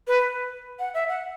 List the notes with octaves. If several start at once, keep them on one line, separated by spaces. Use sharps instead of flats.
B4
F#5
E5
F#5